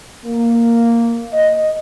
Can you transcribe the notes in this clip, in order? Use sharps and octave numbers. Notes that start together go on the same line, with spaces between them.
A#3
D#5